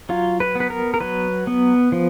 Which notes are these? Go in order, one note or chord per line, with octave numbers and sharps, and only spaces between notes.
F#3 F4
B4
B3
B4
A#4
A#4
F#3 B4
B3
F3